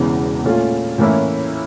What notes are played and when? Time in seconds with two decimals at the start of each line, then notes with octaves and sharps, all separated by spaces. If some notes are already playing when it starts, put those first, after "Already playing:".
Already playing: E1 E2 C#3 E3
0.44 A#2 A3 C#4 F4
0.98 A2 E3 A#3 C#4 E4